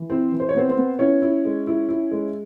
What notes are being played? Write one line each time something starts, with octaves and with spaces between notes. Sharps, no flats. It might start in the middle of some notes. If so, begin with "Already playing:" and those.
Already playing: E3
C4 E4 C5
E3
C5
C#5
B3 C4 C5
C4 C5
B3
C#4 E4 C#5
E4
G#3
E4
E4
G#3